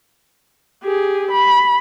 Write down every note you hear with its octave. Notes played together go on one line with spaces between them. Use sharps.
G4 G#4
B5